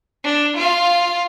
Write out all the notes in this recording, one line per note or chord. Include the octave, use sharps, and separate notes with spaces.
D4
F4 F5